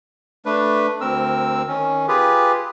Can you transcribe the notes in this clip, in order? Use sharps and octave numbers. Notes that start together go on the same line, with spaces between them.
A3 D4 B4
D2 C4 A#4 E6
D#3 C#4
F4 G4 G#4 B4